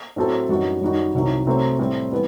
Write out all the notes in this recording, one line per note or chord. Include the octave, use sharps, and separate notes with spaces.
A2 F#3 C4 F#4 A4
F#2 E3 G3 D#4 F#4
F#2 D#3 G3 D#4 F#4
C2 C3 D#3 F#3
C3 F#3 A3 C4
A2 G3 C4
E3 G3 B3